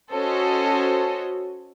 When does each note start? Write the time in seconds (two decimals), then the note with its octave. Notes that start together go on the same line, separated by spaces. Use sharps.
0.13 C#4 F#4 A4 C5 C#5 D#5